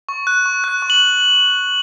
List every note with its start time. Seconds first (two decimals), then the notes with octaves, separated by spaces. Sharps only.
0.09 C#6
0.27 F#6
0.46 C#6
0.64 F#6
0.82 C#6
0.90 F#7